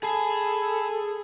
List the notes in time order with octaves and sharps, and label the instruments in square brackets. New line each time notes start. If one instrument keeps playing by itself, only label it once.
[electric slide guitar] G#4 G#5 [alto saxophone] A4 [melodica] A5 B5